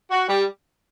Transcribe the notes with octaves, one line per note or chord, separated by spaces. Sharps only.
F#4
G3